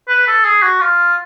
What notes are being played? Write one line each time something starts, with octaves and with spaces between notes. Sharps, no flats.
B4
A4
G#4
F#4
F4